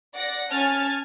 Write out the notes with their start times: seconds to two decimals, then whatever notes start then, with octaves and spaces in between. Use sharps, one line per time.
0.13 D5 F#5 A#6
0.51 C#4 G#5 A5 F6 A6